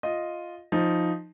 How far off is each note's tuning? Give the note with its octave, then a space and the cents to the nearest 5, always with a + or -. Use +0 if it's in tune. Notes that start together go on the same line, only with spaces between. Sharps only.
F4 +0 D#5 +0
F3 +0 D#4 +0